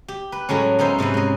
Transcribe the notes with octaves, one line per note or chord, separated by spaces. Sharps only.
G4
B4
A2 F#3 G#3 C#4
B3 C#4 D#4 C5 E5
G#2 C3 C#4 B4
G#3 D#5